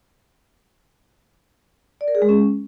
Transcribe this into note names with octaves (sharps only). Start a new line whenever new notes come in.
D5
A#4
G#4
G#3
C#4